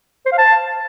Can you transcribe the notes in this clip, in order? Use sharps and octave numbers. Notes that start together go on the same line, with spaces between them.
C5
F5
A5